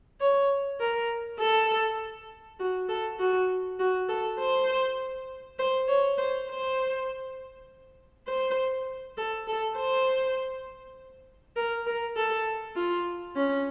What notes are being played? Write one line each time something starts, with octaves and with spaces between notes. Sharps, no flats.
C#5
A#4
A4
F#4
A4
F#4
F#4
A4
C5
C5
C#5
C5
C5
C5
A4
A4
C5
A#4
A#4
A4
F4
C#4